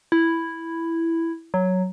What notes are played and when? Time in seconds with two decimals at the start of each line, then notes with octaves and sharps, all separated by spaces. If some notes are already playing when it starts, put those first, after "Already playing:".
0.12 E4
1.54 F#3